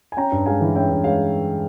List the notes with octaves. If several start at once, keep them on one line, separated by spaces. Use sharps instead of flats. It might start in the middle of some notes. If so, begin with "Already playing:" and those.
G#5
C#4 G5 A#5
G2
G#3 F5 G#5
E3
C#4 E5 G5
G2
G#3 C#5 F5